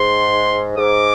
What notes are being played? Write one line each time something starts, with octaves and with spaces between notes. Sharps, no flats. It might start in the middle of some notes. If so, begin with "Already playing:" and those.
Already playing: G#2 C6
G#2 D6